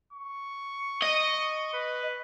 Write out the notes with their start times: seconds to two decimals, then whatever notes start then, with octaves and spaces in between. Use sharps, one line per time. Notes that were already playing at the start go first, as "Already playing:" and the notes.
0.13 C#6
1.03 D#5
1.73 B4